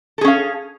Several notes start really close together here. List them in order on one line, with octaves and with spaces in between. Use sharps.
A4 G#4 C#4 F5